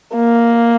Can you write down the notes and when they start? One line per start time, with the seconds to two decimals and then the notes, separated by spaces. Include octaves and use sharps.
0.16 A#3